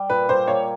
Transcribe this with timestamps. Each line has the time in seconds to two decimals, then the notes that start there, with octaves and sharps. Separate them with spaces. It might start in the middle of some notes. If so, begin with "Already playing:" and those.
Already playing: G3
0.10 A#2 B4
0.29 G3 C5
0.48 A#3 C#5